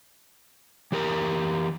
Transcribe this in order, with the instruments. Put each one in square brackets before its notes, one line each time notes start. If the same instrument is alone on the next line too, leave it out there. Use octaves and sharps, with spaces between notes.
[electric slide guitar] E3 G4 A#4 A#5